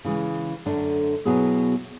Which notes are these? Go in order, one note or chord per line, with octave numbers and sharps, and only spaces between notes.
C#3 E3 G#3
F#2 D3 A3 D4
B2 F#3 B3 E4 G#4